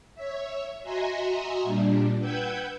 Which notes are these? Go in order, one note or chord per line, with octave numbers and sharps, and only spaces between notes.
C#5 E5
F#4 D#5 E5 G#5 A#5 C6
A#2 G3 D4
B4 F#5 G5 E6 G6 G#6